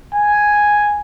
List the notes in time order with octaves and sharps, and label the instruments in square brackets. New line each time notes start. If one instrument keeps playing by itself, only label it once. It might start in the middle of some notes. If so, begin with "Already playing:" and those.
[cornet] G#5